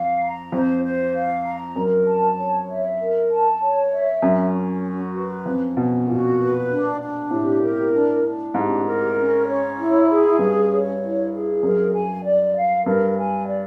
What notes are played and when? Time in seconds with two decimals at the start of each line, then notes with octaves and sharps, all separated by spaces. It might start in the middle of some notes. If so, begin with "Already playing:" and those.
Already playing: F2 F5
0.21 A#5
0.52 F2 C5
0.83 C5
1.14 F5
1.44 A#5
1.75 F#2 A#4
2.06 A5
2.37 C#5
2.68 E5
3.00 A#4
3.29 A5
3.60 C#5
3.92 E5
4.22 F#2 C#4
4.54 C#4
4.84 F#4
5.14 B4
5.45 F2 C#4
5.77 B2 C#4
6.07 A#2 F#4
6.38 B4
6.69 D4
7.00 D4
7.31 A2 G4
7.61 A#4
7.92 D4
8.23 D4
8.54 G#2 G4
8.85 A#4
9.16 C#4
9.46 C#5
9.77 E4
10.08 G#4
10.39 G2 C#4
10.69 C#5
11.01 E4
11.32 G#4
11.63 F#2 A#4
11.93 G#5
12.24 D5
12.55 F5
12.85 G2 A#4
13.17 G#5
13.47 D5